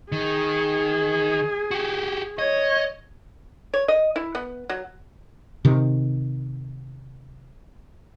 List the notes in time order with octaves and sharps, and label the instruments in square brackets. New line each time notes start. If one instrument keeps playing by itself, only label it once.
[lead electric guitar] D#3 [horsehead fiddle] G#4
[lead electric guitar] F#4 G4
[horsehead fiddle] C#5 [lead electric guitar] D#5
[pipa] C#5
D#5
E4
B3
F#3
[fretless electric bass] C3 D#3